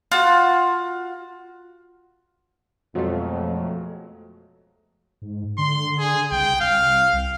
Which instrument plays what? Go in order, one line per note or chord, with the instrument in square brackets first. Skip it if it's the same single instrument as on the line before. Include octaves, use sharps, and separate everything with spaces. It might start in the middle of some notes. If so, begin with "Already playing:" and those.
[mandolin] F4 F#4
[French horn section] F2 [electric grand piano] B2 F#3 G#3 [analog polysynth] F3 A3
[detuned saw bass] G#2
[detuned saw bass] D3 [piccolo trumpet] C6
[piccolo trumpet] G#4
[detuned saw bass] C2 [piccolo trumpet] G5
[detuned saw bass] C2 [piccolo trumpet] F5